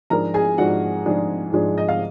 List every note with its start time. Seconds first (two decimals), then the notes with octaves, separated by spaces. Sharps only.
0.10 G#2 F3 G#3 D4 A#4 A#5
0.34 G#4 G#5
0.58 G#2 F3 G#3 D4 F#4 F#5
1.06 G#2 F3 G#3 D4
1.53 G#2 F3 G#3 D4
1.78 D#5
1.89 F5